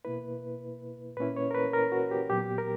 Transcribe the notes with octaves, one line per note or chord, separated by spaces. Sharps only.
B2 A#3 E4 B4
A#2 A#3 C#4 E4 B4
C#5
A#4
B4
A#4
F#4
G4
A#2 F#3 B3 G4
A#4